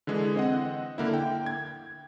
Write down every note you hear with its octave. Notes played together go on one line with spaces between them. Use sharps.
D3 E3 G#3
C4 D#5 F#5
D3 A#3 E4
G5
G#6